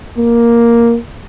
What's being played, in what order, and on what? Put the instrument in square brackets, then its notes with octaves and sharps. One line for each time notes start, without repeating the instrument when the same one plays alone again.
[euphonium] A#3